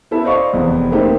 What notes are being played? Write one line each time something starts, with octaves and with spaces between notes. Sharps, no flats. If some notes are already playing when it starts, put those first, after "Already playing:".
B3 E4 A4 E5
C5 D5 D#5 F5 C#6
F1 E2 B3 C4
A3 A#3 C4 D#4 G4